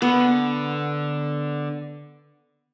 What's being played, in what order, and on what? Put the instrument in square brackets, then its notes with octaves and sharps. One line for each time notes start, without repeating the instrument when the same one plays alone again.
[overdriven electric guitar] D3 [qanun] B3